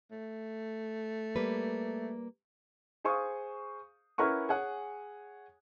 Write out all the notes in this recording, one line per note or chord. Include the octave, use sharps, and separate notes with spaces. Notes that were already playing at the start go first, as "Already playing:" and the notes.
A3
G3 A#3 B4
G#4 C5 F5 C#6 D#6
C#4 E4 A#4 B4 F#5 C#6
G#4 C#5 F#5 G#5